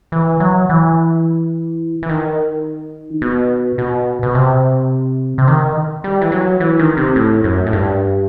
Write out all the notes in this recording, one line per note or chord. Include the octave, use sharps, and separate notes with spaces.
E3
F#3
E3
E3
D#3
B2
B2
B2
C3
C3
D#3
G3
E3
F#3
E3
D#3
C3
A2
F#2
A2
G2